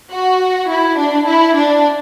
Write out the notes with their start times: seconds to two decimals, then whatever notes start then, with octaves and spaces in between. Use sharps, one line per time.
0.11 F#4
0.69 E4
0.98 D4
1.26 E4
1.56 D4